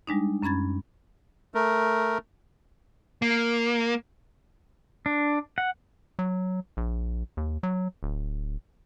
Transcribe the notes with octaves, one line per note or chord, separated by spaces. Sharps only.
G3 G#3 D4 D#4
F#2 C#4 B5 G#6 A6
A3 A#4
A#3
D4
F#5
F#3
A#1
D#2
F#3
D1